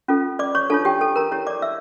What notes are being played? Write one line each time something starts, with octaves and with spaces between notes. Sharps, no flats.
C#4 F4 A4
D5 D6
C#5 C#6
D4 F4 A4 C#5 A5
G4 G5
A4 A5
A#4 A#5
E4 G4 C#5
D5 D6
E5 E6